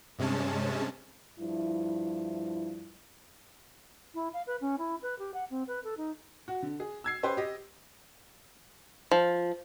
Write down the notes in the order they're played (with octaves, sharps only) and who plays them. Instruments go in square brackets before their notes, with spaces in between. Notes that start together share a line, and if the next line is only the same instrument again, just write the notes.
[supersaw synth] G2 C3 G#3 C#4 A5
[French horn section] G2 F3 E4
[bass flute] E4
F5
B4
C#4
E4
B4
G4
F#5
C4
B4
A4
D#4
[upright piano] F#4
D3
G#4
E6 G#6 C7
C#4 G4 B4 C5 G5 C6
G4 D#5
[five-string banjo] F3